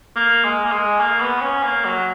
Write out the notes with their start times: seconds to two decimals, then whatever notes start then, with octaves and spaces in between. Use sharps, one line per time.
0.16 A#3
0.44 G#3
0.65 A#3
0.72 G#3
1.00 A#3
1.21 B3
1.42 C#4
1.63 A#3
1.84 F#3